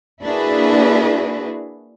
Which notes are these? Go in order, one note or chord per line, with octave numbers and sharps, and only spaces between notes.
A#3 D4 E4 F#4 G#4 B4